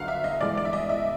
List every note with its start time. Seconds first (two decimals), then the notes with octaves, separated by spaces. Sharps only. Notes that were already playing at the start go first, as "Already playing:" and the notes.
Already playing: G1 F#2 D3 F5 F#5
0.08 E5
0.24 D#5
0.40 G2 E3 G#3 D5
0.57 D5
0.65 E5
0.73 D#5
0.89 E5